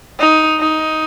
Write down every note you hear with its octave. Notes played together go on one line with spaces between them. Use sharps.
D#4
D#4